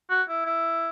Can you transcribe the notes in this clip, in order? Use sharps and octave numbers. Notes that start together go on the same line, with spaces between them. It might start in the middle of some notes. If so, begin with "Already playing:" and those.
F#4
E4
E4